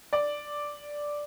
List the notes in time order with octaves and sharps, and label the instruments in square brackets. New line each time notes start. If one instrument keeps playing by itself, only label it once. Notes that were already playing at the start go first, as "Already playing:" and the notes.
[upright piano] D5